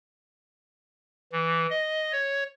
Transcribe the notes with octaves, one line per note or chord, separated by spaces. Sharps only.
E3
D#5
C#5